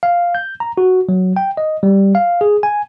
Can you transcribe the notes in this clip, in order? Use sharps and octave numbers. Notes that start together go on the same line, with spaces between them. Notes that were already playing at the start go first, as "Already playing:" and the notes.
F5
G6
A#5
F#4
F#3
G5
D#5
G3
F5
G#4
G#5